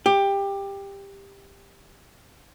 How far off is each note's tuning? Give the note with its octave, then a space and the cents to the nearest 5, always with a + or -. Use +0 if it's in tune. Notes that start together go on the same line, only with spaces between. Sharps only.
G4 +15